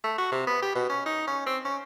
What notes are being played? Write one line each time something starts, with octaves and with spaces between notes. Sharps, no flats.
A3
F#4
C3
B3
G4
B2
C#4
D#4
C#4
C4
C#4